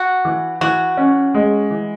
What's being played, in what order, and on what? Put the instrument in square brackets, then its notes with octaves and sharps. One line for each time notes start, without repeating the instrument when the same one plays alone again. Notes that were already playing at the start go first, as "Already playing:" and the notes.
Already playing: [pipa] F#4
[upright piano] E3
[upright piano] E3 [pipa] F#4
[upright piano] C#4
G#3
E3